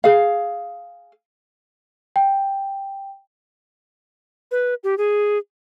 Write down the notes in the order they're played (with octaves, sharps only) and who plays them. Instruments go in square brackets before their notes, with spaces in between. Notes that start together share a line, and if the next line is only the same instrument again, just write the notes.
[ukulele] G#4 F5
[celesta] G5
[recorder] B4
G4
G#4